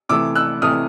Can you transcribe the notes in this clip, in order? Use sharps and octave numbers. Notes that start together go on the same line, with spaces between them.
C3 E3 A3 D6 E6
E6 F#6
C3 E3 A3 D#6 F6